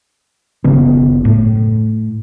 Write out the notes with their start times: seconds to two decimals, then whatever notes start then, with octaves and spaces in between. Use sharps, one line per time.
0.64 F#1 C#3 B3
1.25 A2